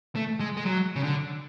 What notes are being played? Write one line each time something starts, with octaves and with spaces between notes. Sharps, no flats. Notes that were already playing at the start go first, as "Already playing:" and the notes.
A3
G#3
G#3
F#3
C#3
D3